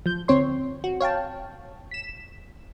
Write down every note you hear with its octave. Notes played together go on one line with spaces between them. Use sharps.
F3 G6
D2 C4 C#5 C6
F#4
C#5 F5 G5 A5
B6 E7